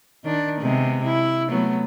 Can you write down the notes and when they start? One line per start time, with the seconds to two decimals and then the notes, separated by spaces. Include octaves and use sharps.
0.24 D#3 D4
0.60 C3 G#3 B3
1.05 E4
1.49 F#3 A3 B3